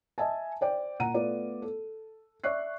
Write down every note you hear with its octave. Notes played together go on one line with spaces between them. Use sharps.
D#5 E5 G#5 A5
C5 D5 G5
A#2 F#5 A#5 D#7
A3 B3 F4 D5
A4
D5 E5 C#6 F#6 C7